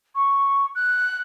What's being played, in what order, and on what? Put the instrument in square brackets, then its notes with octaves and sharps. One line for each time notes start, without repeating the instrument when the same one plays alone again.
[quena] C#6
F#6